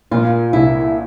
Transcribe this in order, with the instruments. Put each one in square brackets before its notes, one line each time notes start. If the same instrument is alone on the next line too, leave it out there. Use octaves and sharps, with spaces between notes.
[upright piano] A#2 [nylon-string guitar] F4
[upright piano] C2 [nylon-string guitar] E4